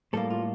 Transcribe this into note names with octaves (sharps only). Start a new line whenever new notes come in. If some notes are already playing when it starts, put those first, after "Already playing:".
A2 G3 A#3 A4
F4